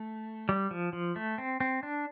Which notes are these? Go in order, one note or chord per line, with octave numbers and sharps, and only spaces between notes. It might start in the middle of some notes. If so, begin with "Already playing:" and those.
Already playing: A3
G3
F3
F3
A3
C4
C4
D4